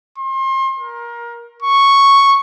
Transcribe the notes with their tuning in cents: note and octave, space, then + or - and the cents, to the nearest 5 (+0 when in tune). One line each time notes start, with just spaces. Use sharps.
C6 +35
A#4 +20
C#6 +0